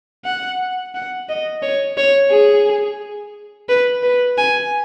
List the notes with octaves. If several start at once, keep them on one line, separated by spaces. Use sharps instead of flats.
F#5
F#5
D#5
C#5
C#5
G#4
B4
B4
G#5